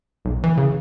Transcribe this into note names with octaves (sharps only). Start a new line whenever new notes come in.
B1
E3
C#3